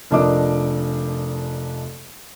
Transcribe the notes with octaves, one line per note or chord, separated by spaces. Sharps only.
F1 F3 D4 A#4 D#5 D6